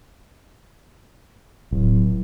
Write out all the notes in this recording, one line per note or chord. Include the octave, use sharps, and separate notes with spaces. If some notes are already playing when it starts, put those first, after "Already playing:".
D1